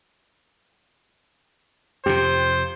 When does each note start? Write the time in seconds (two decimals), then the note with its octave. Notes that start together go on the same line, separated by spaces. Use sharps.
2.06 F2 C3 G4 C5